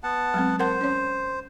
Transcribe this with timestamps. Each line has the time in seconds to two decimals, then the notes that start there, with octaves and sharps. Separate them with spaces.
0.03 B3 F#5 A5
0.34 F#3 G#3 C4
0.59 A#4 C5 F#5 A5
0.81 C#4 C#5